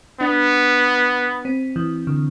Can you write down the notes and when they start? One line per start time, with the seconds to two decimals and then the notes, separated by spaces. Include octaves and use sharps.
0.20 B3 D4
1.45 C4
1.76 E3
2.07 D3